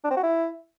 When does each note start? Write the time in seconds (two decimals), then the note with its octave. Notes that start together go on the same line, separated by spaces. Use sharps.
0.04 D4
0.10 C4
0.17 F#4
0.23 E4